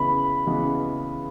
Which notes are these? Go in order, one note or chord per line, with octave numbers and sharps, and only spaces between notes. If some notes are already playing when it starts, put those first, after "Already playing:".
Already playing: C#3 E3 G#3 B3 B4
C#3 E3 G#3 B3